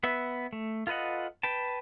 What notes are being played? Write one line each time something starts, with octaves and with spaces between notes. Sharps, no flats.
B3 B4 E5
A3
F4 A4 B4 D#5 F#5
B4 G5 A5